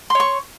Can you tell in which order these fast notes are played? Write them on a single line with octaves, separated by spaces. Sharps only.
C6 C#5 C#6